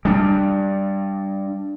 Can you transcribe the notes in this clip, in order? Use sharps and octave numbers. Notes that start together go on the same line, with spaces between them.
G3 D4